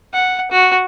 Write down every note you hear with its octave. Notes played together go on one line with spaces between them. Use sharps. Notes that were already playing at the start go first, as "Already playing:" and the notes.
F#5
F#4